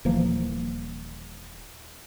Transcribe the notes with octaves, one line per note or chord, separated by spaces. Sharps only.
D#1 E3 F3 A#3